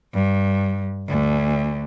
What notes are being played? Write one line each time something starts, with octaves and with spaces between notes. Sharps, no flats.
G2
D2